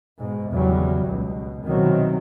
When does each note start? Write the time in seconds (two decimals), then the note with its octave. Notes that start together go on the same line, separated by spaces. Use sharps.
0.20 G#2 B2
0.50 G#1 E2 C#3 F#3 G3
1.06 C#2 B2
1.65 C2 B2 D#3 F#3 C4